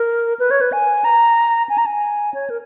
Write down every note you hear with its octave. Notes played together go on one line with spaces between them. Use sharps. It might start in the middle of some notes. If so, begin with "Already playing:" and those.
Already playing: A#4
B4
C#5
B4
G#5
A#5
G#5
A#5
G#5
C#5
A#4